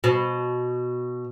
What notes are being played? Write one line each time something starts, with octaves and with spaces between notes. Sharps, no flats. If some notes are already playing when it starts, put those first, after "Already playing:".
B2